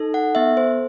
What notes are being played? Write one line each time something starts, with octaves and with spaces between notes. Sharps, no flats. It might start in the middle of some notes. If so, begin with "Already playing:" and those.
Already playing: D#4 A4
F#5
B3 E5
C5